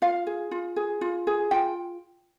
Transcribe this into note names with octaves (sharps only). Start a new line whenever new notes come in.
F4 F5
G#4
F4
G#4
F4
G#4
F4 G5